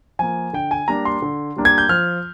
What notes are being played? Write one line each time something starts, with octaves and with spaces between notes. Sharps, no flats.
F3 A#3 G#5
D3 G5
G#5
G3 A#3 D4 A#5
C6
D3
G3 A#3 D4
G#6
G6
F3 F6